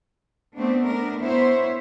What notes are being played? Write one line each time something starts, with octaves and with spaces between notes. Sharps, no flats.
A3 B3 C4 D4
B3 D4 A#4
B3 E4 C5 C#5 E5